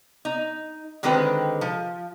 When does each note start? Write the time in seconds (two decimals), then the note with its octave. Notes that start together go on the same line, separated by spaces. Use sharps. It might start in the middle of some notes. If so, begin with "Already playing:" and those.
0.25 D#4
1.03 D3 D#3 G#3 C4 G4 B4
1.61 F3